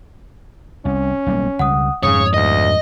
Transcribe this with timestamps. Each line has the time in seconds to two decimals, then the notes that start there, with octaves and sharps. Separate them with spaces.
0.85 C2 C#4
1.27 B1 G3 A#3
1.59 C#2 G3 F#5 D#6
2.03 F2 G#2 C#3 C#5 D#6
2.34 D2 D#5